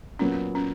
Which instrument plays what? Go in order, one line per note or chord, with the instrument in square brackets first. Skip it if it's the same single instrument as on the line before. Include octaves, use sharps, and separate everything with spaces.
[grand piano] A#2 F#3 B3 [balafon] C#4
[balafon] C#4